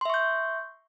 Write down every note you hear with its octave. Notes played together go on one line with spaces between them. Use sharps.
E5 C6 C#6 G6